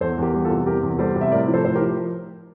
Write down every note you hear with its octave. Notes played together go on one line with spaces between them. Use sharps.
E2 A4 C5
E2 G4 A#4
G3
F4 A4
C3
E2 G4 A#4
E2
G3 A4 C5
C3
E5
A2 A#4 D5
F3
A4 C5
A2 C5
G4 A#4
F3